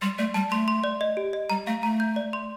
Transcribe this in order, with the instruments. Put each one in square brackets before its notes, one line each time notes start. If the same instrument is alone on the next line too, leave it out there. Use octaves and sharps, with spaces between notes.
[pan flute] G3 [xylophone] C6
[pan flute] A3 [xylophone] D5
[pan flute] G3 [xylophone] A5
[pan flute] A3 [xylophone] C6
[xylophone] C6
D5
D#5
G4
D#5
[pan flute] G3 [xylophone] A#5
[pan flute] A3 [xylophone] F5
[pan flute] A3 [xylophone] A#5
[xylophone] G6
D5
C6